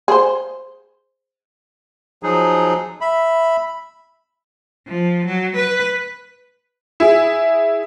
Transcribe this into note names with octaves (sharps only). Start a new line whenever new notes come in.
G#4 C5
F3 F#3 D#4 G#4
E5 B5
F3
F#3
B4
E4 G#4